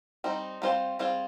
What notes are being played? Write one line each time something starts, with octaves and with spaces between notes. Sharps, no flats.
G3 C4 D#4
G3 C4 F4 G#4 C5
G3 C4 F4 G#4 C5